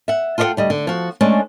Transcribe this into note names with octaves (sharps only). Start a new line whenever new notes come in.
E5 F#5
F4 A4 C5 D#5 F#5 G5
D2 G3 D#5
D3
F3 F#4
G#3 A3 C#4 D4